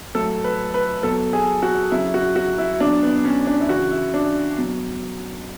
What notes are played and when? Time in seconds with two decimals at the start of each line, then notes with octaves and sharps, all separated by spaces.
0.15 A2 F#3 A4
0.44 B4
0.74 B4
1.03 B2 F#3 A4
1.33 G#4
1.63 F#4
1.92 C#3 F#3 E4
2.14 F#4
2.36 F#4
2.58 E4
2.80 B2 F#3 D4
3.02 B3
3.25 C#4
3.47 D4
3.61 E4
3.69 C#3 E3 F#4
3.91 E4
4.14 D4
4.57 B2 F#3